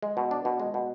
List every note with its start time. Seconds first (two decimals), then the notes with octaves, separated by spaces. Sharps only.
0.03 G#3
0.17 B2
0.31 D4
0.45 B2
0.60 G#3
0.74 B2